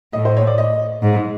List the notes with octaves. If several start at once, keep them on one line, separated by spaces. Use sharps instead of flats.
A2 D#5
C5
C#5
D5
D#5
G#2